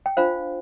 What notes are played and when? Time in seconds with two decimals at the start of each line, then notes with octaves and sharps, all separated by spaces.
0.06 G5
0.17 D4 F4 C5 F5